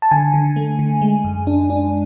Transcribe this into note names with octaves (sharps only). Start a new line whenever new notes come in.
A5
D3 G#5
D3
A3
D3
G#3
F#2
D4
D4